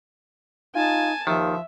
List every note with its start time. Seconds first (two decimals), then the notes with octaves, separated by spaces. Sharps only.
0.75 D#4 F4 G#5 A5
1.27 D#2 D#3 F3 E5